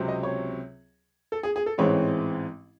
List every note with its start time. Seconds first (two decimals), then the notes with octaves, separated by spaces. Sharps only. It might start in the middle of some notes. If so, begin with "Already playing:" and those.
Already playing: C#2 C3 F#3 C4
0.08 D#5
0.23 C#5
1.32 A4
1.43 G#4
1.56 G#4
1.66 A4
1.78 A1 G#2 E3 G#3 C4 C#5